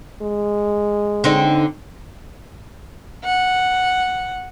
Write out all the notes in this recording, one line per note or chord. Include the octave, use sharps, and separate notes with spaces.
G#3
D3 C4 D#4
F#5